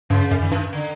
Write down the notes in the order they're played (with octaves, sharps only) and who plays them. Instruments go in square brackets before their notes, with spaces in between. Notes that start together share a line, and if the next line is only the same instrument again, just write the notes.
[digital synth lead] G2 [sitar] C#3
[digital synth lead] F#2
[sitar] D#3
[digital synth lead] G2
[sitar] D3